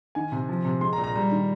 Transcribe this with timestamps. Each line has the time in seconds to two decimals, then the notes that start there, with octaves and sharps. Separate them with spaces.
0.15 D#3 G#5
0.32 C3
0.49 F3
0.65 C3
0.81 G#3 C6
0.93 A#5
0.98 A#2
1.04 A#5
1.15 G3 A#5
1.31 D#3